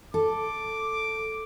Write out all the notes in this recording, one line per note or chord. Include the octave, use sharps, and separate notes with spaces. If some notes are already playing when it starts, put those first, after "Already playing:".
A4 D6